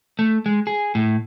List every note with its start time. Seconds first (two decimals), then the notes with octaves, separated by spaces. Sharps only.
0.19 A3
0.46 G#3
0.67 G#4
0.95 A2